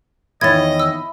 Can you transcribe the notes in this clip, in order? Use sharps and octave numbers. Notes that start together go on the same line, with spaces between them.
E2 D#3 E4 C#5 D#5 G#6 A6
E6